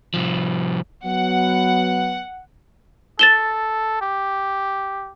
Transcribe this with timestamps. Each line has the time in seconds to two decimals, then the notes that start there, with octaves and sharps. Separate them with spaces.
0.14 C2 F3
1.04 F#3 B3 F#5
3.19 A4 A6 E7 G7
4.01 G4